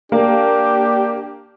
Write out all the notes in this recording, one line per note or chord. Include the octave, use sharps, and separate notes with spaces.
A#3 D4 G4